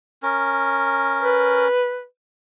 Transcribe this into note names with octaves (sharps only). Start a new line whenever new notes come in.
C#4 A#4
B4